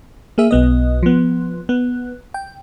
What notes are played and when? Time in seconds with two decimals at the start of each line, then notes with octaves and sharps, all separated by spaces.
0.38 A#3 G#4 E5
0.51 B1 B3 D#5
1.03 F3 B3
1.69 B3
2.34 G5